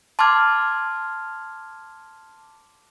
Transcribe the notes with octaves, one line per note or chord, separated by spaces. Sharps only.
A5 C6 D6 F6 G#6